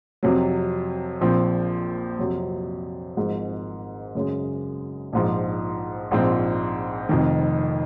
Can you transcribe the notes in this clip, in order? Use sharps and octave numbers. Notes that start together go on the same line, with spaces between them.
F2 C3 F#3
A#1 A#2 F3 C4
F2 C3 F#3
G#1 G#2 F3 G#3
F#2 C#3 G#3
A#1 G#2 F3
A#1 G#2 F3 C4
F1 F2 D#3